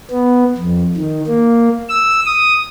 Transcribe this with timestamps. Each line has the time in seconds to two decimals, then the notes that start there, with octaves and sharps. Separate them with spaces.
0.11 B3
0.58 F2
0.97 D#3
1.27 A#3
1.89 E6
2.25 D#6